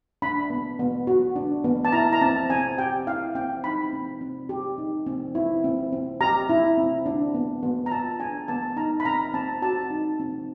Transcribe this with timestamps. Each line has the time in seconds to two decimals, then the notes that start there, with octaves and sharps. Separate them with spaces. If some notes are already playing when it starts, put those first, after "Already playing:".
0.22 D4 B5
0.50 B3
0.79 B3
1.07 F#4
1.36 D4
1.64 B3
1.85 A5
1.92 E4 A#5
2.13 A#5
2.21 C4 A5
2.50 C4 G#5
2.78 G4 G5
3.07 E4 F5
3.35 C4 G5
3.64 D#4 B5
3.93 C4
4.21 C4
4.49 G4
4.78 D#4
5.06 C4
5.35 E4
5.64 C4
5.92 C4
6.21 G4 A#5
6.49 E4
6.78 C4
7.06 D4
7.34 B3
7.63 B3
7.86 A#5
7.92 F4 A5
8.19 D4 G#5
8.48 B3 A5
8.77 D#4 A#5
9.00 B5
9.05 C4 A#5
9.34 C4 A5
9.62 F#4 A5
9.90 D#4
10.20 C4